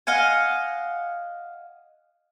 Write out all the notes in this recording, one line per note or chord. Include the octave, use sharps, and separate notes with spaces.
D#5 F5 F#5 G#5